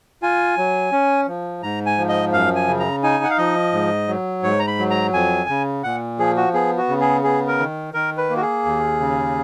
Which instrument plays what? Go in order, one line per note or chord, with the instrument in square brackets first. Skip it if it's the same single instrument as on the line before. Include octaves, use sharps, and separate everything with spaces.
[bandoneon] F4 G#5
F#3
C#4
F3
G#2 A#5
G#5
F3
D#5
F#2 F5
G#5
C#3
A#5
D#4 G#5
F#5
F5
F3 D#5
G#2
F#3
G#2 C#5
A#5
B5
F#3
A#5
F2 G#5
C#3
A#2 F#5
F3 G#4
F#4
B3 G#4
F#4
C#3
G#4
B3 G#4
A#4
D#3
D#3 A#4
B4
A#3
F#4
G#4
D#2
C#3